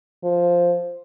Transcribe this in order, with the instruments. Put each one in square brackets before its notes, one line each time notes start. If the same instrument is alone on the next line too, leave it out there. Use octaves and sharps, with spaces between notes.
[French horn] F3